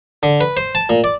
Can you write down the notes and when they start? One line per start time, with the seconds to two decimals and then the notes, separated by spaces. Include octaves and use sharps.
0.23 D3
0.41 B4
0.57 C5
0.75 A5
0.89 A#2
1.04 D5